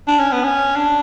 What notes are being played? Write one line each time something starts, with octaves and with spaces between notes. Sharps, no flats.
D4
C#4
B3
C#4
D4